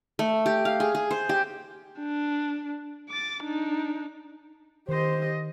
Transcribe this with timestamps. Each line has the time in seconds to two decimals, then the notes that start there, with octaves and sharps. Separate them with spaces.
0.19 A3
0.46 G4
0.65 F5
0.80 G#4
0.95 G#4
1.11 C5
1.29 G4
1.99 D4
3.09 D6 A6
3.44 D4 D#4
4.89 D#3 G4 C5 D#5